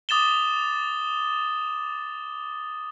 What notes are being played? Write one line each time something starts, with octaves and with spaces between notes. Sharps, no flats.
D6 D#6 A6 E7 G7